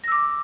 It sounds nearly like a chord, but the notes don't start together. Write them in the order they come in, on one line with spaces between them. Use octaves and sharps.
A#6 E6 D6